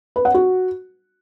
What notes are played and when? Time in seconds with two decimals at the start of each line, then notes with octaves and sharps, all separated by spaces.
0.16 B4
0.25 F#5
0.34 F#4